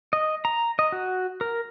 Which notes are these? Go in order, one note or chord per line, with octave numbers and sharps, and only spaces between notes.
D#5
A#5
D#5
F#4
A#4